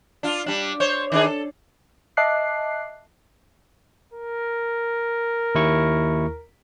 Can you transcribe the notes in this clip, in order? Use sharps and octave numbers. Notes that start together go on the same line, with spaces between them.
D4 F4
G3 D4
C5 C#5
D#3 D4 G#4
A4
D#5 E5 A5 D6 F#6 C7
A#4
D#2 E4 C#6